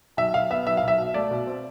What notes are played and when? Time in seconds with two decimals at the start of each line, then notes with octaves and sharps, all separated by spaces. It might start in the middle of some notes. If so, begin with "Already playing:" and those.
0.17 B1 E5
0.34 B1 F5
0.50 B3 E5
0.66 B1 E5
0.77 F5
0.83 B1 E5
0.98 B2
1.14 A3 D5
1.31 B2
1.47 C4